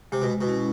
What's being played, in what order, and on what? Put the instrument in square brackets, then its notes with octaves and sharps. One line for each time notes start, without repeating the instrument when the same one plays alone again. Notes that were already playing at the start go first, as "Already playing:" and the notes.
[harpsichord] C3 [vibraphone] G#3
[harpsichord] B2
B2
[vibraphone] C#4 E4